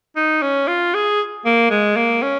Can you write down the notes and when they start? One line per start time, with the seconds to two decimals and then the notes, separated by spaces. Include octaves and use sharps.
0.17 D#4
0.42 C#4
0.68 F4
0.94 G#4
1.46 A#3
1.71 G#3
1.96 A#3
2.23 C#4